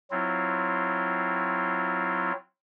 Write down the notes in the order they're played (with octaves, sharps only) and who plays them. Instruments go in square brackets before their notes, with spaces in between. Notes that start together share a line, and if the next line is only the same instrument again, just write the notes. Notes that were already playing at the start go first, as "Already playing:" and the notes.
[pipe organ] F#3 C4 E4 F4